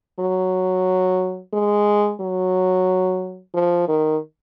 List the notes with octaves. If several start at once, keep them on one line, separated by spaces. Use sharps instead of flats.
F#3
G#3
F#3
F3
D#3